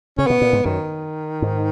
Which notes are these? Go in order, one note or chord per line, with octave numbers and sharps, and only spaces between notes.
C#3 C#4
B2 B3
A#2
G#2
F#2 D#3
G#2